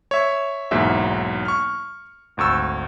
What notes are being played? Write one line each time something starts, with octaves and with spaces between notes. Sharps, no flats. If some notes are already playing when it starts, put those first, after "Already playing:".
C#5 E5
B1 E2 G#2 F#3 A#3 E5
C#6 F6
G#1 D2 C#6 E6